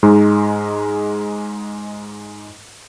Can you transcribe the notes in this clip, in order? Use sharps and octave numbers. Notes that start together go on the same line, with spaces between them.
G#2 G#3 D#4